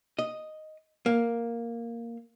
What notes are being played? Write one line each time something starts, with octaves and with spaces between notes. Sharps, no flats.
D#5
A#3